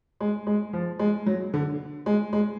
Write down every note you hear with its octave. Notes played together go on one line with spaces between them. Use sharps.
G#3
G#3
F3
G#3
F#3
D3
G#3
G#3